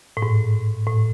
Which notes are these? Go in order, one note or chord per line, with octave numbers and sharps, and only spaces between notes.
A2
G#2
A2